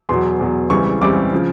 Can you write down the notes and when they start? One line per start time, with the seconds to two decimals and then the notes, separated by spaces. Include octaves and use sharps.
0.09 E2 B2 F#3 C6
0.40 E2 B2 F#3
0.70 C#2 C#3 E3 G3 C4 C#6
1.01 C#2 C#3 E3 G3 C4 D6
1.33 C#3 F3